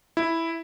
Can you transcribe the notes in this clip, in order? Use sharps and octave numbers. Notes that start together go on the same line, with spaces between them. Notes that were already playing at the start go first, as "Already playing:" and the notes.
E4